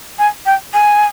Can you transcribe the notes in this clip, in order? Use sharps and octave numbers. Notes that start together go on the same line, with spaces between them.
G#5
G5
G#5